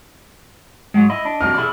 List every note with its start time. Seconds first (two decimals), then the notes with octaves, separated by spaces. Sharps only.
0.94 G#2 F#3 G#3
1.10 E4 D#5
1.25 D4
1.41 C3 E3 F#3 F6
1.54 B2 E4 G#4 D5